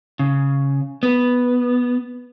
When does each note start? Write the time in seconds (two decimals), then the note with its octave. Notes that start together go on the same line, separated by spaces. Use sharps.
0.19 C#3
1.03 B3